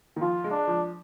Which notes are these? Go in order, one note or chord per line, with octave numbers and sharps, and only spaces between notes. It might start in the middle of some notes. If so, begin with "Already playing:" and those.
D#3
F3 F4
G#3
D4
F3